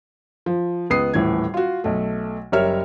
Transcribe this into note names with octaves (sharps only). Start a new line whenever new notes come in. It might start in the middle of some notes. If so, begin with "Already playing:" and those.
F3
C#2 B3 D#6 C7
D#1 A2 E3 G#6
F4 F#4
B1 A3
F#1 G3 A#4 C#5 E5 F6